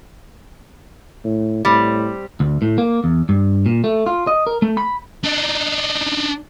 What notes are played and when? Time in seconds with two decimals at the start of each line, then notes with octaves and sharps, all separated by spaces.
1.24 A2
1.65 A2 G3 C4
2.40 D2
2.62 A2
2.78 A#3
3.04 E2
3.29 G2
3.66 A#2
3.84 A3
4.06 F4
4.27 D#5
4.47 A#4
4.62 A3
4.77 B5
5.24 D4 D#4